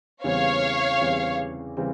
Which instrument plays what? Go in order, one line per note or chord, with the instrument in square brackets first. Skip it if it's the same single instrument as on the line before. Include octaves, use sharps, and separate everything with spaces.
[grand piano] E2 C#3 E3 G3 C4 [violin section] C#5 F5
[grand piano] E2 C#3 E3 G3 C4
C#3 E3 G3 C4